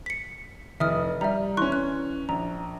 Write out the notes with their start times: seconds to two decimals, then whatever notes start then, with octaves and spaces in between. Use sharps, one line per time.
0.06 B6 C#7
0.80 F1 E3 E5 D#6 F6
1.21 G3 E5 A#5
1.57 E3 C#4 C6 C#6 F#6
1.72 F#6
2.29 A#1 A#5